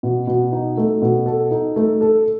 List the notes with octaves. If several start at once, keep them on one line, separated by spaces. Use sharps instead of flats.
B2
B2
D#4
A3
B2
A4
D#4
A3
A4